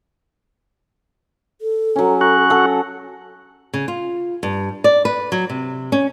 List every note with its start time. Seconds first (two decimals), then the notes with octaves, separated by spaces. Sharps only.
1.61 A4
1.96 F#3 C#4
2.21 F#4
2.50 A4 F#5
3.73 C#3
3.88 F4
4.43 G2
4.84 D5
5.05 B4
5.32 F#3
5.50 C3
5.92 C#4